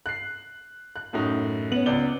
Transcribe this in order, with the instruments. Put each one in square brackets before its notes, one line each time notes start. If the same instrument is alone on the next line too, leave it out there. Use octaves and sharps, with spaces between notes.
[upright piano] F#6 C7
F#6
F#2 A2 D#4
[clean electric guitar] B3 [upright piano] C#4 F#7
[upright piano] C#2 D5 G7